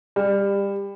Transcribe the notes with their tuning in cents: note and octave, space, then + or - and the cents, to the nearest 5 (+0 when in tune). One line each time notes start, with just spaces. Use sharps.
G3 +25